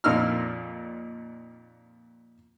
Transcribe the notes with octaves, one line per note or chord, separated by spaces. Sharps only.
F2 A#2 D#4 E6 F6